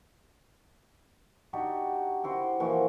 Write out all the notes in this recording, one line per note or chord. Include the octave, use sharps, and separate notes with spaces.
D4 D#4 F#4 G4
E4 F#4 C5
A#2 E3 F3 F#4